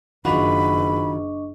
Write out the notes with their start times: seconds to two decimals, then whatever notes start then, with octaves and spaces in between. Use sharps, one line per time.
0.25 F#1 D#3 D4 F4 F#4 D#5 B5 C#6